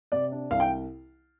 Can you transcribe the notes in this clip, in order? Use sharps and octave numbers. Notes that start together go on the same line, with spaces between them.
C3 D5
D4
C2 F5
G5